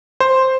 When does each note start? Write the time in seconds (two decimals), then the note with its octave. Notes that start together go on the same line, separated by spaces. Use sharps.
0.20 C5